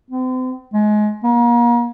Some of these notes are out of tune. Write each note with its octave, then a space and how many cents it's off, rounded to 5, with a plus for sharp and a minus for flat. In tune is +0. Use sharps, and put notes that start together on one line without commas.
C4 -40
G#3 +25
A#3 +35